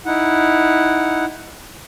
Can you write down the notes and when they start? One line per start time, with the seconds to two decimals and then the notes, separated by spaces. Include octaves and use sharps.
0.06 D#4 E4 F#5